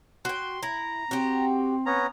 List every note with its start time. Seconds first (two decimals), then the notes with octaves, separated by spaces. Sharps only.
0.25 F#4 G5 C6
0.63 E4 A#5
1.11 C4 F#4 G4
1.86 B3 C#4 A#5